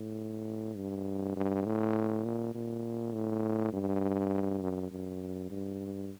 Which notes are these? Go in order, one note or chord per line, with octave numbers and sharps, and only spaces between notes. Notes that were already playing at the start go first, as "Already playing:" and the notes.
Already playing: A2
G2
G2
A2
A#2
A#2
A2
G2
F#2
F#2
G2